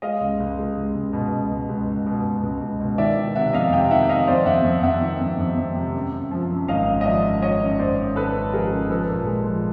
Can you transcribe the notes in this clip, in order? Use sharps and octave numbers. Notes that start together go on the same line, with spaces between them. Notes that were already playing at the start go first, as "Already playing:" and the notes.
G#3 D#5 F5
C#2
C#2
G#3
C#2
C#2
B2
C#2
C#2
C#2
B2
B2
B2
C#2
C#2
B2
D#3 D5 E5
D#3
C3 E5 F#5
F2 D#5 F5
C3 F5 G5
D#3 E5 F#5
C3 D#5 F5
F2 C5 D5
F2 E5 F#5
F2
F2 E5 F#5
D#3
F2
F2
F2
C3
F#2
F#2
F3
F#2
G#1 D#5 F5
C#3
D#5
F3 D5 E5
F#2
F3 C#5 D#5
F#2
F#2 C5 D5
F#2
G#1 A4 B4
C#3
F3 G#4 A#4
C#3
F3 A4 B4
A#2
G#3
F3